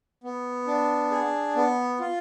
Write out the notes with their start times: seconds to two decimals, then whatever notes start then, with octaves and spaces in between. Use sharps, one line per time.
0.24 B3
0.67 D4
1.11 G#4
1.56 B3
2.00 F4